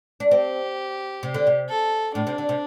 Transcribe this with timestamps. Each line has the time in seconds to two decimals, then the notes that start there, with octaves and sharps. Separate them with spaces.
0.20 D4
0.31 C4 G4
1.23 C3
1.34 D3
1.47 C3
1.69 A4
2.15 A2 D4
2.27 C3
2.38 D3
2.49 C3